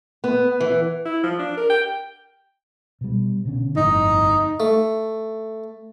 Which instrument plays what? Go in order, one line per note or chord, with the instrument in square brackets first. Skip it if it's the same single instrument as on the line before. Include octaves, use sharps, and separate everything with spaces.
[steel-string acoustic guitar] B3
E3
[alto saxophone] E4
F3
D4
A#4
G5
[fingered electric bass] B2 G3
B2 D3 C#4
[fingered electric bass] G1 F2 A2 [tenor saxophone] D#4
[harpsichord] A3